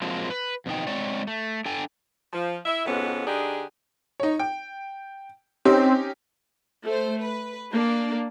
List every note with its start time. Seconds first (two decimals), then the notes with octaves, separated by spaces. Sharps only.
0.02 F3 F#3 G#3 A#3 C4
0.30 B4
0.66 F2 B2 D#4 G5
0.87 G#3 C4 C#5 D5
1.27 A3
1.66 D4 A4 G5 G#5
2.33 F3
2.65 E4 E5
2.85 F2 G#2 B2 B3 C#4
3.27 D3 D4 D#4 G4 G#4
4.20 D#4 C#5
4.40 G5
5.65 C4 C#4 D#4 G4
6.83 A3 C5
7.21 B4
7.72 A#3 D4